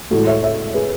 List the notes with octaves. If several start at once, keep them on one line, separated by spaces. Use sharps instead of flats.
A2 E3 G#3 F#4 A4
C#5 E5
C#5 E5
G#4 B4